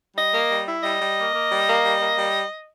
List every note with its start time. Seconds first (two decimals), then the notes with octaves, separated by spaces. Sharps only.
0.16 G3 D#5
0.33 A#3
0.50 G3
0.67 E4
0.83 G3 D#5
1.00 G3
1.17 A#3
1.34 A#3
1.50 G3
1.67 A#3
1.84 G3
2.00 A#3
2.17 G3